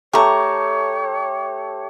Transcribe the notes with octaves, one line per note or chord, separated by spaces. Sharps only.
A3 G4 C#5 A5 A#5 C#6